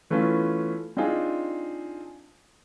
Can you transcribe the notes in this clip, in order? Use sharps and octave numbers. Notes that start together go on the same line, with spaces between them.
E3 A3 B3 C#4 F4
C4 D4 D#4 F4 G#4